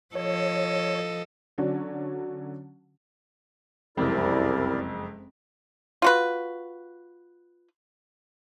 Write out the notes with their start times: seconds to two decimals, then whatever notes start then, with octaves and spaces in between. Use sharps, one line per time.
0.15 F3 A4 C#5 D#5
1.58 D3 F#3 C#4 D4
3.97 F#1 C2 F2 G#3 C4 E4 A#4 D5
6.02 F4 F#4 B4